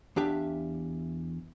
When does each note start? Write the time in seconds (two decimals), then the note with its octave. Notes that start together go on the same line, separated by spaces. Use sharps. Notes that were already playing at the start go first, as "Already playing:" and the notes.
0.16 E2 D4 G4 E5 F5